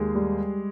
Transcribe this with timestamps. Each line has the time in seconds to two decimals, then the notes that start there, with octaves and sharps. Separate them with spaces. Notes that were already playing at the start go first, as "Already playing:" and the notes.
Already playing: D#2 G#3 G#4
0.15 G3